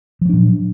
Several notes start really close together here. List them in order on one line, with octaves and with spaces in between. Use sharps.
F3 F#3 D4 A#2